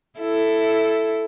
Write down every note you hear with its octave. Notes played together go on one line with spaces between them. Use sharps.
E4 A4